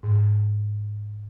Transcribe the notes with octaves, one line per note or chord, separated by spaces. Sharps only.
G#2